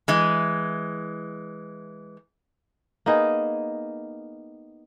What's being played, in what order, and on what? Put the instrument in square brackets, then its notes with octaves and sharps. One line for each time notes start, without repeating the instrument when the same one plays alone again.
[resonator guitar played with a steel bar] E3 G#3
[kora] A#3 B3 D#4 G#4